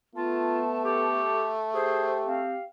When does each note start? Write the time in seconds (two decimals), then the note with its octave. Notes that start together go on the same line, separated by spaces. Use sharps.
0.15 A3 B3 F4 A5
0.85 G4 A4
1.74 G4 G#4 C5
2.26 C4 F5